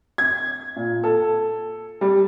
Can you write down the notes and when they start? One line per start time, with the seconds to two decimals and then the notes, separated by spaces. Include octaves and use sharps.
0.18 G#6
0.76 A#2
1.04 A4
2.01 G3